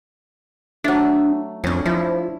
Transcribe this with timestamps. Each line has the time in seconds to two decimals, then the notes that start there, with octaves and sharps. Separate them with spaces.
0.84 F#3 A3 D4
1.64 F2 C#4 D4
1.86 F3 E4